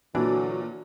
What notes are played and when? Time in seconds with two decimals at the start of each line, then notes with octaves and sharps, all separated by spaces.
0.15 A#2 D3 E3 F#3 D4 F#4 D5